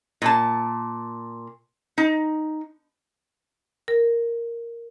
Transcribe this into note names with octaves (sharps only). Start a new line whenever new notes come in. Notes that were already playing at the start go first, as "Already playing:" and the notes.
A#2 A5
D#4
A#4